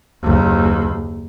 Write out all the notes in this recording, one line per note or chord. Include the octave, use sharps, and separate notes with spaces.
F#1 D#2